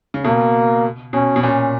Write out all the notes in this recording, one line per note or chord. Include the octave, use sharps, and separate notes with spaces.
C#3
B2 A#3
B2 C#4
B2
A#2 C#4